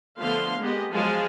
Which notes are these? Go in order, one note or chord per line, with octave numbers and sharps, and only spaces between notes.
D3 F3 A3 B3 F5 C6
G#3 A#3 B3 G4 D#5
F3 F#3 G#3 G#4 F5 A5